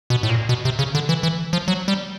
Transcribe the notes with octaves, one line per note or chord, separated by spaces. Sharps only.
B2
A2
A#2
B2
C3
C#3
D3
E3
E3
F3
F#3
G3